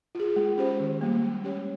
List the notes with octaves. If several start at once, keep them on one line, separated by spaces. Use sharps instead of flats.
F4 G#4
G#3
C#4 G4 C5
D#3
G3 A#3
G#3
C#4 G4 C#5